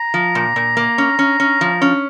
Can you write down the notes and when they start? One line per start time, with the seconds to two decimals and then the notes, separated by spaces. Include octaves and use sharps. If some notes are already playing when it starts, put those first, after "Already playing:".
Already playing: A#5
0.14 F3
0.35 A#2
0.56 A#2
0.77 A#3
0.98 C#4
1.19 C#4
1.40 C#4
1.61 F3
1.82 C#4